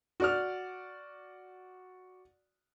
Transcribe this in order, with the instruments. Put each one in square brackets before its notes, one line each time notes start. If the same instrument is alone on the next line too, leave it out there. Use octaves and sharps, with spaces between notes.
[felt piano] F#4 D5 F6